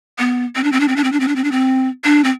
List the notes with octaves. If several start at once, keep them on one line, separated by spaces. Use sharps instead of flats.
B3
C4
D4
C4
D4
C4
D4
C4
D4
C4
D4
C4
D4
C4
D4
C4